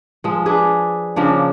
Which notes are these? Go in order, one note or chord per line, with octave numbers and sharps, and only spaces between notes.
F3 G#3
D4 G#4 B4
C#3 F3 A#3 D4